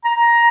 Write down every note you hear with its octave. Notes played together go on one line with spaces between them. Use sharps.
A#5